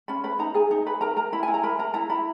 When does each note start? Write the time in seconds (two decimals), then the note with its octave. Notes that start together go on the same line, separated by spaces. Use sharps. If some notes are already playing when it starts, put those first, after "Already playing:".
0.08 C#4 B5
0.24 B4 B5
0.39 D#4 A#5
0.54 G#4 G#5
0.71 D#4 A#5
0.86 B4 B5
1.01 A#4 A#5
1.16 A#4 A#5
1.32 E4 B5
1.43 E4 G#5
1.54 A#5
1.63 A#4 B5
1.79 A#4 A#5
1.94 E4 A#5
2.10 E4 B5